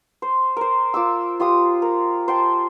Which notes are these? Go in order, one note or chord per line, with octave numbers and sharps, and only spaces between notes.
C5
A#4 C5
F4 D6 E6
F4 G4 C6 D#6
A#4
C5 G5 A5